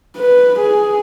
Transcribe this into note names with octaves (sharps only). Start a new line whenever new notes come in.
B4
G#4